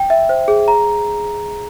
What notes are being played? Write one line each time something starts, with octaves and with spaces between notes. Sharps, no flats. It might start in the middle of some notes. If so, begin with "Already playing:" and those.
Already playing: G5
E5
C5
G#4
A#5